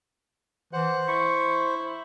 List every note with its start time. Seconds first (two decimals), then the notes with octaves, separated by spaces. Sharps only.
0.73 E3 C5 F#5
1.08 E4 C#6